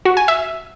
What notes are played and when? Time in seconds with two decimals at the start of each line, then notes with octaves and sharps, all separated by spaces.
0.05 F#4
0.17 G#5
0.28 E5